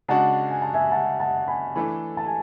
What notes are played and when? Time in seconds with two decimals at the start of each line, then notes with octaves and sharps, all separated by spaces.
0.08 C#3 G#3 D4 F#4 F#5 A5
0.50 G#5
0.62 A5
0.74 E5 G#5
0.92 F#5 A5
1.20 F#5 A5
1.47 G#5 B5
1.75 E3 A3 D4 A4 G#5 B5
2.17 A5
2.26 G#5